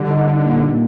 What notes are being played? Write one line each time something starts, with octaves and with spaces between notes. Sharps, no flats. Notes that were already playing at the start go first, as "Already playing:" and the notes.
Already playing: D3 G3
D#4
D#4
A#2
A#2